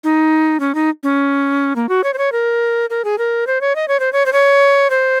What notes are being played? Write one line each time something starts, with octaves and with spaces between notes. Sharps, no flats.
D#4
C#4
D#4
C#4
A#3
F#4
C#5
C5
C#5
A#4
A#4
G#4
A#4
C5
C#5
D#5
C#5
C5
C#5
C5
C#5
C5